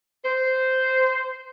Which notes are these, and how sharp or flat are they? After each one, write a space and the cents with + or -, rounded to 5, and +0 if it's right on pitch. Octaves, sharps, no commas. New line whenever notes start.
C5 -10